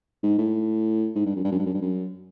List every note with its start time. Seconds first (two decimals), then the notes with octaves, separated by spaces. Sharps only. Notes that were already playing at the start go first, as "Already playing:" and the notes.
0.23 G#2
0.38 A2
1.15 G#2
1.26 G2
1.36 F#2
1.44 G2
1.52 F#2
1.59 G2
1.66 F#2
1.74 G2
1.81 F#2